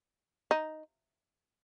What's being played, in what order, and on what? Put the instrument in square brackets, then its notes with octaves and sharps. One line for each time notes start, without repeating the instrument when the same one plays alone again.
[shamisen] D#4